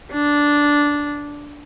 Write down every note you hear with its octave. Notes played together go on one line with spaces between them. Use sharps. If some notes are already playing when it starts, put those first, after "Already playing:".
D4